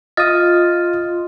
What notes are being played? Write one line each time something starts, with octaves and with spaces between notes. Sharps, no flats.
F4 D#5 F5 D#6 F6 A6